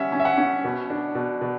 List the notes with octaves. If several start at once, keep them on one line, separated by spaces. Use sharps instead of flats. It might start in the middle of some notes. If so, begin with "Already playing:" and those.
Already playing: G3 C#4 E5 F#5
C#4
E5
F#5
C#4
B2
D4
B2
B2